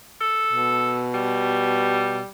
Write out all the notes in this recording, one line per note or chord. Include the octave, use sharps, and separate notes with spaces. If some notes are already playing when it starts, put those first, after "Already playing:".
A4
B2
G3